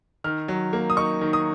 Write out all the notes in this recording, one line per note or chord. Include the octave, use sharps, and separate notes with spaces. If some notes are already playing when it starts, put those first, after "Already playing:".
D#3 F6
F#3
A#3
D#6
D#4 C#6
D#3
D#6